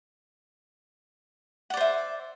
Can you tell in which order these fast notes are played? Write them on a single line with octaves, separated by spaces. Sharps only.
F#5 D5 C5 E5